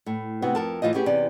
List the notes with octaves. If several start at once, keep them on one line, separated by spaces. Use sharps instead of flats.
A2
C3 B3 F#4
F2 A#4 A5
A2 E3 F4 C5 D#5
B3 C#4 G4 G#4
E2 C3 C#4 D5